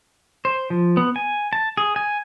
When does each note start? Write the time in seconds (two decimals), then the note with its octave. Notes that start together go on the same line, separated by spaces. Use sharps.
0.45 C5
0.70 F3
0.97 B3
1.16 G#5
1.53 A5
1.77 G#4
1.96 G#5